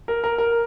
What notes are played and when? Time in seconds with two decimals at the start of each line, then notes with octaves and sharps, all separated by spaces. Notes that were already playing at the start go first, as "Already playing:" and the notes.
0.08 A#4
0.24 A#4
0.38 A#4